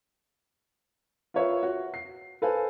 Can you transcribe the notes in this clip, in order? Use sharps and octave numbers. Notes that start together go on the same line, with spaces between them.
F4 A#4 B4 C#5 E5 F5
F#4
C7
A4 B4 C5 F5 G#5 A5